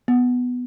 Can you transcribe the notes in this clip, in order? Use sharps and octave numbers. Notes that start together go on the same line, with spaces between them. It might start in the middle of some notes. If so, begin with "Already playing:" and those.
B3